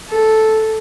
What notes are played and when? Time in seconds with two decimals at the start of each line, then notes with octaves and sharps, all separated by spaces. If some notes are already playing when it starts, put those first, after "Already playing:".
0.09 A4